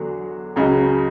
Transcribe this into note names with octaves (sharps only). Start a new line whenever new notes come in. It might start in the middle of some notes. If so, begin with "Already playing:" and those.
Already playing: E2 D3 F#3
C#2 C#3 F#3